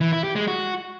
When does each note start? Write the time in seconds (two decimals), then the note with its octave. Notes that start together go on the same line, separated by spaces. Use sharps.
0.01 E3
0.12 E4
0.24 G4
0.36 G#3
0.47 F#4